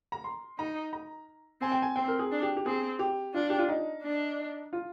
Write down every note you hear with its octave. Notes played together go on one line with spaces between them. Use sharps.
A#5
C6
D#4 A#5
A#5
C4 G#5
G5
G#5
C4 G5
A#4
G#4
D4
G4
G4
C4 G#4
G4
D4 F4
G4
F4
D#4
D4
F4